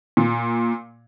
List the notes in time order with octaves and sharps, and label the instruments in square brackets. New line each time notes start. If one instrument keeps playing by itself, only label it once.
[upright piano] A#2